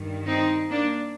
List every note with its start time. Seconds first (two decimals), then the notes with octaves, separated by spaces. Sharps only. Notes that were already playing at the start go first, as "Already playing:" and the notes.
Already playing: G2 D#3
0.26 C4 D#4
0.70 A#3 D4